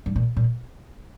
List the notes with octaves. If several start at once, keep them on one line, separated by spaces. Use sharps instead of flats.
G2
A#2
A#2